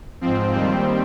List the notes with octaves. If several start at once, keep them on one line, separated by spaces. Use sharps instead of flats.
G#2 F3 C4
D#2 D#3 G3 C4